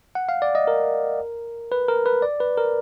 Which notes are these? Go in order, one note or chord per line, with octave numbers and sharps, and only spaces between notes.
F#5
F5
D5
D#5
A#4
B4
A#4
B4
D5
B4
A#4